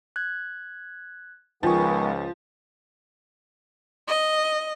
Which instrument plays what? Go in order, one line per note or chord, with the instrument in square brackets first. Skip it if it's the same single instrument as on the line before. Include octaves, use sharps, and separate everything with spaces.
[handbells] F#6 G#6
[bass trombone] C#2 [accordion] D#3 G#3 B3 [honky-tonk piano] F3 [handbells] G5 G#5 C#6
[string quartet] D#5